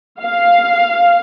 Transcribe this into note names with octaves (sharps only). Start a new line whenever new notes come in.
F5